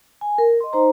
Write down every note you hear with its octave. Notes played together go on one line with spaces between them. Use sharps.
G#5
A#4
D#5 C6
D#4 C5 A#5